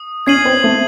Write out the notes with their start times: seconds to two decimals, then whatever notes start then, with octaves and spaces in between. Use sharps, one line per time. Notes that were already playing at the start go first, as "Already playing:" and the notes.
Already playing: D#6
0.26 C#4 G#6 C7 D#7 F#7
0.45 C4
0.64 A3